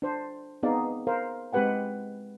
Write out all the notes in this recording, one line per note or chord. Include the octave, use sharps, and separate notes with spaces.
D4 C5
B3 C4 D#4 G#4 D5 F5
A#4 C5 F5
G#3 C4 G4 B4 F#5 G#5